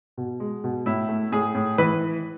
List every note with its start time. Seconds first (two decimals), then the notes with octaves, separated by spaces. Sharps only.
0.17 B2
0.40 G#3
0.64 B2
0.86 A2 E4
1.09 A3
1.32 A2 G#4
1.55 A2
1.78 E3 B4